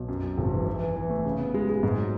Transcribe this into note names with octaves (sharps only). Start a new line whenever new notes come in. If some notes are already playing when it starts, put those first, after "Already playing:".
Already playing: B1
F#2
F#2
G#1
E3
E3
E3
E3
A3
C#3
B3
G#3
G#3
G#2
F#3